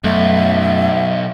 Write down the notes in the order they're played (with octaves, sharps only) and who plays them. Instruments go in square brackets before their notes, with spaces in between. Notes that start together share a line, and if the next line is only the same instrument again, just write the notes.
[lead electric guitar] B1 [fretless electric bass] F#2 A3 [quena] E5